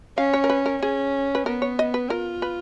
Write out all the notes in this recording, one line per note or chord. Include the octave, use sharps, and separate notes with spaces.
C#4 F5
C#5
A#4
B4
A#4
C#4 G#4
B4
B3 A#4
C#5
D#5
B4
F4 A#4
B4